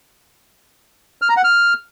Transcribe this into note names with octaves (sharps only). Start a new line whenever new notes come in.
F6
A#5
F#5
F6